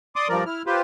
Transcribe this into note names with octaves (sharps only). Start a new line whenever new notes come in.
D5 C6 D6 D#6
G2 F3 A#4 D5
E4 F6
F4 G4 B4 C5